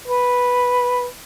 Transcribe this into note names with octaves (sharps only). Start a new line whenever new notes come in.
B4